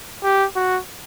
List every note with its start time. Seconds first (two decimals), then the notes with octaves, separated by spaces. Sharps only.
0.23 G4
0.56 F#4